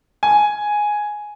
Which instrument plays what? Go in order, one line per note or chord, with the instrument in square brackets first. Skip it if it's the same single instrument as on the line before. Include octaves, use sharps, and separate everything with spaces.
[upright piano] G#5